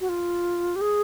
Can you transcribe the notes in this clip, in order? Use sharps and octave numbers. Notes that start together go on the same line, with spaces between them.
F#4
F4
G4
G#4